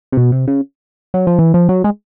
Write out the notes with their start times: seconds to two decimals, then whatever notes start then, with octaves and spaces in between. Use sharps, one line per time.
0.12 C3
0.17 B2
0.32 C3
0.47 C#3
1.14 F#3
1.27 F3
1.39 E3
1.54 F3
1.69 F#3
1.84 G#3